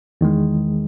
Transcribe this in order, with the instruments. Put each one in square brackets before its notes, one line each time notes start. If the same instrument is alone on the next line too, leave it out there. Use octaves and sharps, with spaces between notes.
[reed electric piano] E2 D#3 G#3